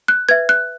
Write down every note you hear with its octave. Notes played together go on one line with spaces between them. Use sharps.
F#6
B4 E5 G#6
F#6